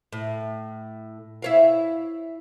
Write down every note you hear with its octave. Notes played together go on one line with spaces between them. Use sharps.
A2
E4 C#5 F5